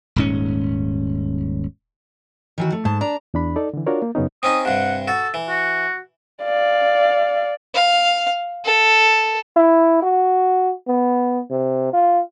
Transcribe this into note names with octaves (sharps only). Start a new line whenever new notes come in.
D#1 G#2 C#4
D#3 E3 F#4
A3
G#2 A5
D4 A#5
E2 D4 B5
D#4 A4 D5
D3 E3
D4 F4 F#4 A#4 C#5 D5
A#3
F#2 C#3 B3 C#4 D#4
C4 C#4 D#4 D#6
G2 C3 F#5
F#4 A4
E3
F#4
D5 F5
F5
A4
E4
F#4
B3
C3
F4